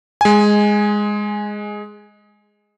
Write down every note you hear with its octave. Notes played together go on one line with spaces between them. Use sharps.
G#3 G#5